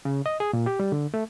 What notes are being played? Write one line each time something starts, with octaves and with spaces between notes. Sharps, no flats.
C#3
D#5
G#4
A#2
G4
G3
D3
A3